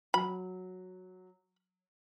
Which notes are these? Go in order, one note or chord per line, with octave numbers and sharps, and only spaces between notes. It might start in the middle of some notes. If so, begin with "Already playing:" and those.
F#3 B5